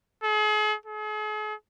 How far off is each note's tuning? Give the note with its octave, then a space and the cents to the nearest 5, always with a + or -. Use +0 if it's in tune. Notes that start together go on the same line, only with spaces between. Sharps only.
G#4 +40
G#4 +45